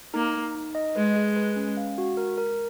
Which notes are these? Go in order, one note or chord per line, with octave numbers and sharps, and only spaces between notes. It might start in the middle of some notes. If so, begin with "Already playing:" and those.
A#3 D#4
D#4
D#4
D#5
G#3 B4
G#4
B4
C#4
F5
F#4
A#4
A#4